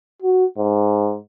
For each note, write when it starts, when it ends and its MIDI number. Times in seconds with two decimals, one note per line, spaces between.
0.23 0.45 66
0.58 1.16 44